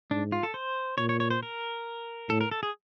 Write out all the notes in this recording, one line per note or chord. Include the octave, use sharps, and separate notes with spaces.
G#2 D4
F4
A4
C5
A#2 C#5
C#5
C#5
C5
A#4
A2 A4
A#4
A4
G#4